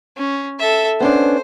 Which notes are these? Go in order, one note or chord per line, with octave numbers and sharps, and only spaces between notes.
C#4
A4 E5
B3 C#4 D4 C5